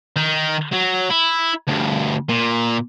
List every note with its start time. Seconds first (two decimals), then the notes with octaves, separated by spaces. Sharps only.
0.16 D#3
0.73 F#3
1.11 E4
1.68 D2 G2
2.29 A#2